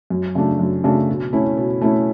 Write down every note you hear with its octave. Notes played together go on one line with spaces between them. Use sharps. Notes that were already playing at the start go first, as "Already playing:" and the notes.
F#2
C#3 F#3 A3 D4
F#2
C#3 F#3 A3 D4
B2
A3 C#4 E4
B2
A3 C#4 E4